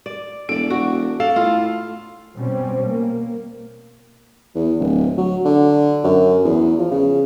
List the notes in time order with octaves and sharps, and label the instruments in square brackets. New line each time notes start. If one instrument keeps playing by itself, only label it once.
[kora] D5
[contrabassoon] E1 [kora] A4 D5 [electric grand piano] D7
[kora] F#4
[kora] A4 [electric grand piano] F5
[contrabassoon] A2 [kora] F4
[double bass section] B2 G3 C4 C#4
A#3
[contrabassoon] E2
D1
F#3
D3
F#2
E2
F3
C#3